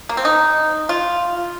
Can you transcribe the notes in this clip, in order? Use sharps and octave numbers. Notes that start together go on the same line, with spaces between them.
A#3
C4
D#4
F4